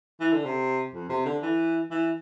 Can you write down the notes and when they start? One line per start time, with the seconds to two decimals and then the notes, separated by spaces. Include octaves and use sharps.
0.20 E3
0.32 D3
0.45 C3
0.94 F2
1.09 C3
1.25 D3
1.42 E3
1.91 E3